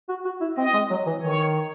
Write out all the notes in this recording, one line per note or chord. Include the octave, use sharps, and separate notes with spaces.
F#4
F#4
E4
C4 D#5
G#3
F#3
E3
D#3 C#5